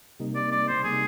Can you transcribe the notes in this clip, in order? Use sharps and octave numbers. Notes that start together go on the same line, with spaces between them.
C3 G3 A#3 D#4
D5
D5
C5
C3 G3 A#3 D#4 G#4